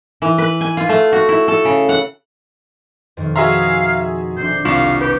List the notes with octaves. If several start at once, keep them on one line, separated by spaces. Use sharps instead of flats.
E3
B4
G#5
F4
A3
F#4
E4
A4
C#3
F#5
F2 B2 D#3
F#4 G#4 E5 F5 A5 A#5 C6 A6
F1 D4 C5
C2 F4 F5
G4 B4 C#6